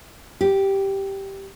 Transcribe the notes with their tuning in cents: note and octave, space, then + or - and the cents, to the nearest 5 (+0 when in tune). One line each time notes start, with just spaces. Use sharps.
G4 -5